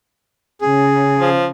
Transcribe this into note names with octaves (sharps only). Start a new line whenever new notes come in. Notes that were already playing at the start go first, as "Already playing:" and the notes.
C#3 G#4
F3